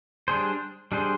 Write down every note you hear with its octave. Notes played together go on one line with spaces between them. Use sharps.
G3 D4 G#4 C5
G3 D4 G#4 C5